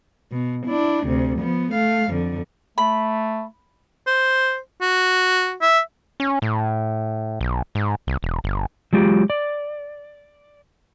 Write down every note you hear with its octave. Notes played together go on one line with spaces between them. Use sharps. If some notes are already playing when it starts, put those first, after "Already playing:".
B2
D4 E4
D2 C3
F3 B3
A3 F5
F2 D3
A3 B5
C5
F#4
E5
C#4
A2
B1
G#2
C2
E1
G1
F#3 G#3 F4 G4
D5